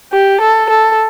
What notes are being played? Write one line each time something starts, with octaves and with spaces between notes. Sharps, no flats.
G4
A4
A4